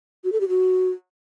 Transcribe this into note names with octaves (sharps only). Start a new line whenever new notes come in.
F#4
A4
G4
F#4